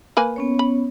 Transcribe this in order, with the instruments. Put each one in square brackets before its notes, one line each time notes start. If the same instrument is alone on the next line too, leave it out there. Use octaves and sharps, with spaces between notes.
[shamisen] A#3 B4 G#5
[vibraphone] B3 C#4 C#5
[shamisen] B5